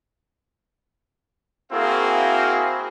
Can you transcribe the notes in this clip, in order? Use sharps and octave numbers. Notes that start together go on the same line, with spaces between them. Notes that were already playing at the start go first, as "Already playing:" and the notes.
A#3 C4 E4 F#4 G#4 F5